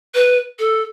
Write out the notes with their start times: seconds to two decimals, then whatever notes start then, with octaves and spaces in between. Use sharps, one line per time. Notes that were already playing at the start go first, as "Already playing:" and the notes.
0.15 B4
0.59 A4